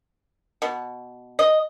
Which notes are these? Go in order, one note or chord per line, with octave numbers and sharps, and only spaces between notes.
B2
D#5